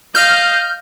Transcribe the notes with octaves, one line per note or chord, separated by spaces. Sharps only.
D#5 F5 F6 G6